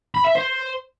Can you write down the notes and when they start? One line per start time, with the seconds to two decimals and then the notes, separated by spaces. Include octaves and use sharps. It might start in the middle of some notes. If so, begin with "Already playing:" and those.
0.15 B5
0.25 E5
0.35 C5